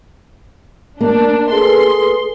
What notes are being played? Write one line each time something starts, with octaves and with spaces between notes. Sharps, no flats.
A#3 D4
G#4 A4 B4 C6